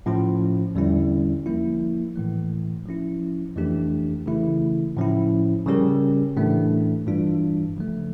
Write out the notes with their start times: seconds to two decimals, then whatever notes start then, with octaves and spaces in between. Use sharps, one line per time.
0.06 A2 F3 C#4 F4
0.75 E2 D3 G3 C#4 E4
1.46 F3 A#3 E4
2.16 A2 E3 A3
2.86 F3 C#4 E4
3.56 F2 E3 A3 D4 G4
4.26 C#3 E3 A3 E4
4.97 A2 F3 C#4 E4
5.66 C#3 G3 C#4 G4 A#4
6.37 A2 E3 A3 D4
7.07 G2 E3 G3 D4 F4
7.77 C#3 F3 A3